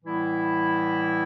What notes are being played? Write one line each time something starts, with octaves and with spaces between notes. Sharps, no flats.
A2 E3 G3 B3 E4